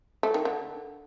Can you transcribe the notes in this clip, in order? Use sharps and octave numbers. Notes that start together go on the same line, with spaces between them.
A3
D#3
D3